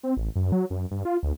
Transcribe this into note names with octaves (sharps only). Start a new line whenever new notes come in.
C4
A1
F#2
F#3
F#2
G2
F4
D2